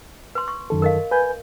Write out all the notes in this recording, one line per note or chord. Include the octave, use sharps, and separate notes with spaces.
B4 C6
C#6
F#2 D#3 A4
A#4 D#5 F5
B4 G#5 G6